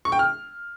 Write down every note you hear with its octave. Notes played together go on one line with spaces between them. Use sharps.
C#6
G5
F6